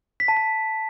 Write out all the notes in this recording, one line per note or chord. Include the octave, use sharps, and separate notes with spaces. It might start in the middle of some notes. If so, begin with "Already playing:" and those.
B6
A5
B6